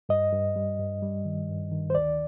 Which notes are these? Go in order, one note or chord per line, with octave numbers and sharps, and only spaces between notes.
G2 D#5
G2
G3
G2
G3
D#3
G2
D#3
C5
D2 D5